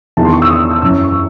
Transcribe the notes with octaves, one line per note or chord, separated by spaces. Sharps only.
E2 D#3 A5
C6
C#6
E6
D#6
E6
F#2 E3 E6
C#6